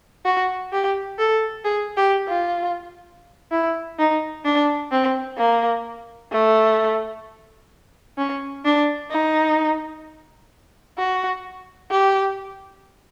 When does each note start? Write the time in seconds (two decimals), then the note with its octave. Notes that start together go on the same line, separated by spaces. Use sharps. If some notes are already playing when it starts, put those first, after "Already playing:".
0.26 F#4
0.72 G4
1.19 A4
1.65 G#4
1.97 G4
2.28 F4
3.51 E4
3.99 D#4
4.45 D4
4.92 C4
5.38 A#3
6.32 A3
8.18 C#4
8.65 D4
9.11 D#4
10.98 F#4
11.91 G4